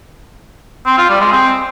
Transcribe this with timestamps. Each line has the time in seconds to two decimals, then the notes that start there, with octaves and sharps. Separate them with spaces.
0.86 C4
0.98 F4
1.09 G3
1.21 G#3
1.32 C4